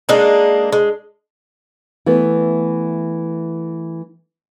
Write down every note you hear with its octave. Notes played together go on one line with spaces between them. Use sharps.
G#3 A#3 D4 D#4
G#3
E3 A3 B3